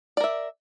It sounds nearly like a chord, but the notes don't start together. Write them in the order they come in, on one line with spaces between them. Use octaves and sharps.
D5 A#4 E5